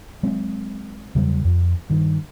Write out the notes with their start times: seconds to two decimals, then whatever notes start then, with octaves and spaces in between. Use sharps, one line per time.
0.23 F#3 G#3 C4
1.15 E2 C#3 F#3 G3
1.45 F2
1.90 G2 D#3